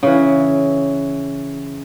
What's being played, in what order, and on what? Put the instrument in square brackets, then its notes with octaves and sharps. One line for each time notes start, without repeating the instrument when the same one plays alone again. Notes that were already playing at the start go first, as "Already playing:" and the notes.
[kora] C#3 E3